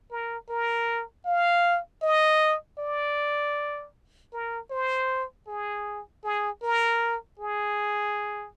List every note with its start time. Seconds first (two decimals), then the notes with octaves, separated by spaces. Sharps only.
0.11 A#4
0.49 A#4
1.25 F5
2.02 D#5
2.79 D5
4.33 A#4
4.71 C5
5.48 G#4
6.24 G#4
6.63 A#4
7.40 G#4